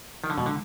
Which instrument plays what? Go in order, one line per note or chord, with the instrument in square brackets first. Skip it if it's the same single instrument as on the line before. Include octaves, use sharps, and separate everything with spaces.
[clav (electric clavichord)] D#3
D3
[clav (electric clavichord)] B2 [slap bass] D#3 G#3 B3
[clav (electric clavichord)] D3